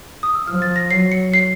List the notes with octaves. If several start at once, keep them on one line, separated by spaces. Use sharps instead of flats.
D#6
E6
F3 F6
A6
A#6
F#3 C7
C#7
C7